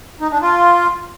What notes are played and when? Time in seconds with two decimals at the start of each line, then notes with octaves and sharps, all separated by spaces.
0.21 D#4
0.31 D4
0.42 F4